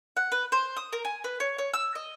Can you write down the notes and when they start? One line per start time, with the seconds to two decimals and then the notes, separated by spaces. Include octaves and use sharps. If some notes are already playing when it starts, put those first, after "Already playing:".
0.17 F#5
0.32 B4
0.52 C5
0.77 D#6
0.93 A#4
1.05 G#5
1.24 B4
1.40 C#5
1.58 C#5
1.73 E6
1.95 D#5